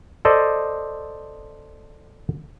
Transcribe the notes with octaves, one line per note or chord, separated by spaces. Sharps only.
A4 C5 D5 D#5